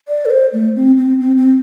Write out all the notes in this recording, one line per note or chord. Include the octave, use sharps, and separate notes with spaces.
D5
A4
C5
A3
C4
C4
C4
C4